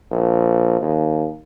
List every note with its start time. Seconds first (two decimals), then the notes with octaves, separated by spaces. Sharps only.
0.11 A#1
0.82 D#2